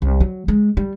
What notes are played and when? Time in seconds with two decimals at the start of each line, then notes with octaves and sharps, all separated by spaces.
0.02 C2
0.20 F#3
0.48 G#3
0.77 G3